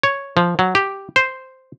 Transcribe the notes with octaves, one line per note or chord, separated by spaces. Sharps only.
C#5
F3
F#3
G4
C5